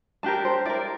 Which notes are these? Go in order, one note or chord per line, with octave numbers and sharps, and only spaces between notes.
D4 G4 A#4 A5
C5
E4 A#4 D5